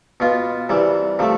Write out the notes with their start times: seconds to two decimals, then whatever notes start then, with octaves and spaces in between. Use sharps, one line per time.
0.20 B2 B3 F4
0.69 C3 E3 G3
1.19 C3 F3 A3